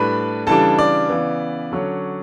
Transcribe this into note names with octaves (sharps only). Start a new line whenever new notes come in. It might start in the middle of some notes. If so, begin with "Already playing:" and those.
Already playing: A2 G3 D4 B4 B5
C#3 E3 G3 D4 A4 A5
D5
C#3 E3 B3
D3 F#3 C#4